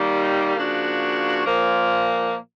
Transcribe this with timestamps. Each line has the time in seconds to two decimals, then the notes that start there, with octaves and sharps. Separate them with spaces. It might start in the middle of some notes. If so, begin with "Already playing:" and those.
Already playing: D#3 G3 A#3
0.56 C#3 F3 A#3 D4 F#4
1.45 A#2 F3 A#3